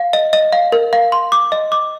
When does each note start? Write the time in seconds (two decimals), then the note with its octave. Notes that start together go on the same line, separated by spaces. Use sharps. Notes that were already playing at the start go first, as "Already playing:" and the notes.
Already playing: F5
0.13 D#5
0.33 D#5
0.53 F5
0.72 A#4
0.93 F5
1.12 C6
1.32 D6
1.52 D#5
1.72 D6